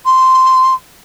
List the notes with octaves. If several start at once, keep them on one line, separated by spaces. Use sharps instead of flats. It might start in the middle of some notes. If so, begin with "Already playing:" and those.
C6